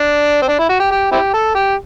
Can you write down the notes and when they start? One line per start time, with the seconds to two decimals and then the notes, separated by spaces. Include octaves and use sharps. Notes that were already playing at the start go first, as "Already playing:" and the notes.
Already playing: D4
0.42 C4
0.48 D4
0.59 E4
0.70 F#4
0.80 G4
0.91 G4
1.12 C4 E4 G4
1.34 A4
1.55 G4